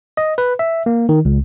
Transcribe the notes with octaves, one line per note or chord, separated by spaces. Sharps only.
D#5
B4
E5
A#3
D#3
C#2